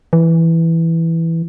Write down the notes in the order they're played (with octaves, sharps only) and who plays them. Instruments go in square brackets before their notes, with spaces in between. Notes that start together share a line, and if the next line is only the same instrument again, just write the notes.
[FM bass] E3